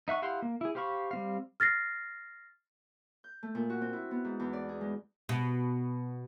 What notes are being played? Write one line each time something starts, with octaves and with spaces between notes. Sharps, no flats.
D#4 E5 F#5 C#6
E4 G4 F5 F#5 C6
A#3
E4 G#4
G4 C5 F5 B5 C#6
G3 C4 F5
F6 A6 A#6 C7
G6
A3
A#2
F#4
C4
E4
B3
G#2
E2
D5
G#4
G#3
B2